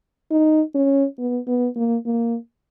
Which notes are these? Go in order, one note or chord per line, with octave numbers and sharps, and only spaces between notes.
D#4
C#4
B3
B3
A#3
A#3